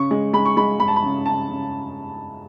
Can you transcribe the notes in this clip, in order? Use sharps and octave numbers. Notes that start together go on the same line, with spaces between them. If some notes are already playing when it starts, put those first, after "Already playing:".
Already playing: C#3 C#6
G#3
G#3 B5
C#6
G#3 B5
G#3 B5
A5
B5
C#3
C#3 A5
C#3